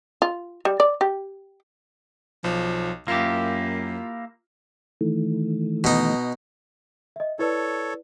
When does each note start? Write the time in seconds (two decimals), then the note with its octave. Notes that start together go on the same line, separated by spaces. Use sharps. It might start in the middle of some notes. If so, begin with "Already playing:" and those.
0.22 F4
0.65 G3
0.80 D5
1.01 G4
2.44 B1 F3
3.08 F#2 A#3 E4 F4 G4
5.01 D#3 E3 A3
5.84 B2 D#4
7.16 D#5 E5
7.39 E4 A4 B4 C#5 D5